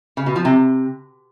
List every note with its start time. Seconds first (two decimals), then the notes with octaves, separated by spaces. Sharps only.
0.17 C#3
0.26 B2
0.36 F3
0.45 C3